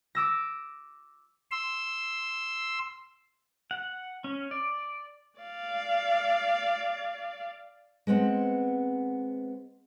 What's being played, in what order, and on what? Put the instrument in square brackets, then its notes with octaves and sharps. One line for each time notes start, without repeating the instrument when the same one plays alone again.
[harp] D6 E6 A#6
[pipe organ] C6 E6
[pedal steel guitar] F#5
C#4
D5
[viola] D5 F5
[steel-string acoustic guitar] G#3 B3 C4 F#5